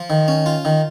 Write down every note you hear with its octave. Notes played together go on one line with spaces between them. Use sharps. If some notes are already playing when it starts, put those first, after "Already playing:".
Already playing: F3
D#3
C#4
F4
D#3